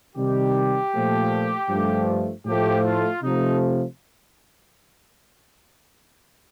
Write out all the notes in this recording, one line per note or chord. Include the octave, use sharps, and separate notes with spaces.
C3 D#3 G3 G4
A#2 F3 A3
G2 F3 A3
A2 F3 A3 G4
F4
C3 F3 A3 D#4